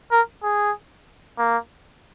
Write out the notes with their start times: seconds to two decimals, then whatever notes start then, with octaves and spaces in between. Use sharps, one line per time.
0.11 A#4
0.43 G#4
1.38 A#3